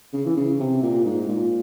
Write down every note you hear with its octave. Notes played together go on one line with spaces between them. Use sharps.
C#3
E3
C#3
C3
A#2
G#2
A#2